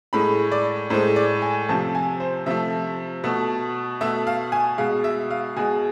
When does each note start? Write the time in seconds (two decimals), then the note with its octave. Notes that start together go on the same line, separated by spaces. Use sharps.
0.13 A2 G#3 B5
0.52 D5
0.90 A2 C5
0.94 G#3
1.16 D5
1.42 G#5
1.69 C3 F3 A3 A5
1.95 G#5
2.20 C5
2.46 C3 F3 A3 E5
3.24 B2 A3
4.01 B2 A3 E5
4.27 F5
4.52 G#5
4.78 B2 G#3 F5
5.04 E5
5.31 F5
5.56 B2 G#3 G#5